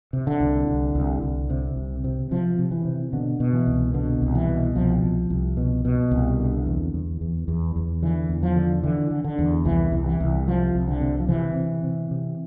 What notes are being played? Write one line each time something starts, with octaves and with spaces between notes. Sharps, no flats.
C3
D3
C2
C2
C2
C2
C3
C2
C3
C3 F3
C3
E3
C3
B2 D3
B2
E3
C2
B2 D3
C2
E3
B2
C2 F3
C2
C2
B2
B2
C2
D3
E2
E2
E2
E2
E2
D3 E3
E2
F3
D3
D3 E3
D3
D3
E2
C2 E3
C2
E3
C2
C3 F3
C2
D3
C3
F3
C3 E3
C3
C3
C3